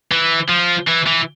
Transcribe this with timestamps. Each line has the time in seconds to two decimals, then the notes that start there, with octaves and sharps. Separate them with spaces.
0.12 E3
0.49 F3
0.88 E3
1.07 E3